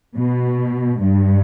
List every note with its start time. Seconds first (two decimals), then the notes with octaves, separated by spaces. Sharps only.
0.18 B2
1.00 G2